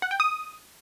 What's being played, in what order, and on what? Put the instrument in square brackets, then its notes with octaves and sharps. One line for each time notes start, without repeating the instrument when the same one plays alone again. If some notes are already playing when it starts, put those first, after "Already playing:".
[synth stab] F#5
G5
D#6